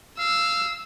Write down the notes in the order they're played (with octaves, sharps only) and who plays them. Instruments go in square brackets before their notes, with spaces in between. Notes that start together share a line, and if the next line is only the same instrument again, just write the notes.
[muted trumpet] F5 [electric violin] E6